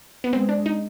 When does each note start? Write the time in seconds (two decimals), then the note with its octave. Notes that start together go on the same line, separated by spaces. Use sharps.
0.24 B3
0.33 G#3 C4
0.49 D4
0.66 D#4